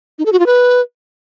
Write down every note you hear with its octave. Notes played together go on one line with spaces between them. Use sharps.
D#4
A4
F#4
F4
B4